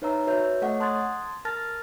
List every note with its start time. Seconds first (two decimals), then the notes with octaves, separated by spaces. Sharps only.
0.02 D#4 B4 C#5 E5 A#5 E6
0.27 F#4 B4 C#5 E5 G6
0.62 A3 A4 C#5 D#5 F#5 C#6
0.80 A5 C6 D#6 F#6 G#6 A6
1.45 A#4 A5 F6 A6 A#6